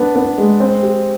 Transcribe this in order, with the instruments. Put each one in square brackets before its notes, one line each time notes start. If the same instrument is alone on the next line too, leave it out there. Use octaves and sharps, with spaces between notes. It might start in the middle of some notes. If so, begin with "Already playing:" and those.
Already playing: [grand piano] B3 D4
B3
G#3
C4
G4